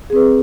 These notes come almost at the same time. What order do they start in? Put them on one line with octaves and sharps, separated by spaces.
G#4 C4 B4